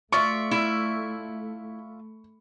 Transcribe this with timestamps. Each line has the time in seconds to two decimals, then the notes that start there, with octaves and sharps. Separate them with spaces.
0.12 A3 F4 D5 E5 C#6
0.51 E4